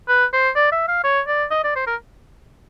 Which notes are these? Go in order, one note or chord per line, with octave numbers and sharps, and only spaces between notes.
B4
C5
D5
E5
F5
C#5
D5
D#5
D5
C5
A#4